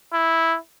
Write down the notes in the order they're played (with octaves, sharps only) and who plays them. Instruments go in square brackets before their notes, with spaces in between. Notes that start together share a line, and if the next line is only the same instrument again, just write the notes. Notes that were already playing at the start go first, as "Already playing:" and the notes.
[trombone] E4